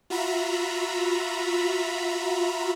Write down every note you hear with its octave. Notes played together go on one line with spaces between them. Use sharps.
F4 F#4 E5 A#5 B5